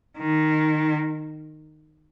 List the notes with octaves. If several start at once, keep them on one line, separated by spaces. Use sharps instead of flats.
D#3